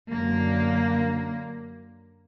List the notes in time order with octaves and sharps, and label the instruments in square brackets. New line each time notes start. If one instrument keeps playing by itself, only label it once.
[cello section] F#2 D3 F#3 A#3